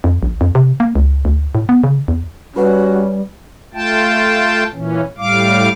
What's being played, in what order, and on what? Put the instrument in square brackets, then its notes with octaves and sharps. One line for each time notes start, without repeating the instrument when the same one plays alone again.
[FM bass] F2
A#1
F2
C3
A#3
C#2
D2
A2
B3
C#3
E2
[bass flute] G3 [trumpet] C#4 [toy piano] F4 B4 F#5 [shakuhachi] F#4
[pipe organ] A3 F4 G5 A5
A#2 E3 C#4
A2 G3 F5 D6